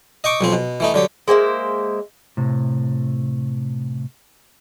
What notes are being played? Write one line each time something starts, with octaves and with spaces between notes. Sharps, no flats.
D#5 G5 C#6 D6
B1 F3 C4
B2
E3 A3 D#4
D3 F#3 G4
G#3 A#3 C5 E5
A2 C3